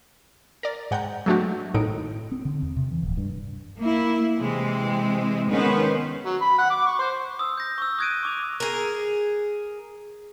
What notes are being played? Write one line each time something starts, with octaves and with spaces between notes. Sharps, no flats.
A#4 D5
G#2 F#5 G5 A#5 G6
F#3 G#3 A3 D4 F#4 G4
G#1 A2 D#4 D7
C4
D3
E2
C3
E3
D1
G2
A#3 E4
C3 E3 G#3 C4
D#3 G#3 B3 C#4 B4 C5
F#3
B5
F#5
D6
C#6
C5
D#6 E6
G6 A#6
C#6 E6
D#6 F#6 G#6 A#6 D7 D#7
C#6 D6 F7
G#4 A#4